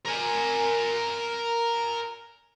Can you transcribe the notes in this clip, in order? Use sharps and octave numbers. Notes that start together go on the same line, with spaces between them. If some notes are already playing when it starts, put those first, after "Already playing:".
A#4 G#5